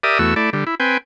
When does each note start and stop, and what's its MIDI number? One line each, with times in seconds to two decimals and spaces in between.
0.03 0.18 67
0.03 0.18 70
0.03 0.18 74
0.03 0.18 76
0.03 0.18 87
0.19 0.34 40
0.19 0.34 57
0.19 0.34 66
0.19 0.34 88
0.36 0.50 57
0.36 0.50 64
0.36 0.50 74
0.53 0.64 50
0.53 0.64 55
0.67 0.75 64
0.80 0.97 60
0.80 0.97 71
0.80 0.97 79
0.80 0.97 80